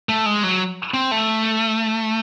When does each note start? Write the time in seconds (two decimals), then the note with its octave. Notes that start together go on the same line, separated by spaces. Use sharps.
0.09 A3
0.26 G#3
0.44 F#3
0.94 C4
1.11 A3